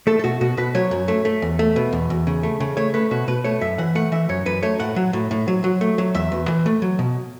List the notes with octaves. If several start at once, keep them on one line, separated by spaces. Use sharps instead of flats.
A3 A4
A4
B2 F#4
B2 F#4
B2 B4
F#3 C#5
F#2
A3
A3
E2
A3
B2
E2
E2
C#3
A3
C#3
A3 C#5
A3 B4
B2 F#4
B2 B4
A3 C#5
F#2 E5
E3 F#5
A3 F#5
E3 E5
F#2 C#5
F#2 B4
A3 C#5
A2 F#5
F#3
A2
A2
F#3
F#3
A3
F#3
E2 E5
E2
E3
A3
F#3
B2